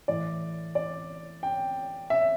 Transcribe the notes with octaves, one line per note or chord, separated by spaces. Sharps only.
A2 E3 D5
D5
G5
E5